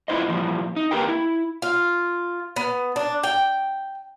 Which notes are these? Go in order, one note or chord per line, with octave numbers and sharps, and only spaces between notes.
B3 E4 F4 C5 D#5
A#2 E3 F3 G3
D#4
A#3 G4 A#4 B4 G5
E4
F4
B3
D4
G5